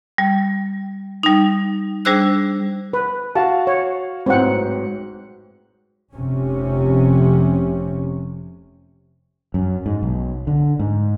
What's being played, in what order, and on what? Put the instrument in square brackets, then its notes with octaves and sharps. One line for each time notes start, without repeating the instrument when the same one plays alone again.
[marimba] G3
G3 D#4
G3 D4 G#4 C5 E6 F#6
[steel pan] B4
[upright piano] F#4 F5 F#5 [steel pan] A5
[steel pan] C#5
[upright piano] A1 G#2 F#3 [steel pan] C4 F#5
[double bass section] F1 C3 C#4
[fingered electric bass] F#2
G#2
B1
D3
G#2